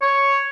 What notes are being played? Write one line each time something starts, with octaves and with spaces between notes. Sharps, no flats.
C#5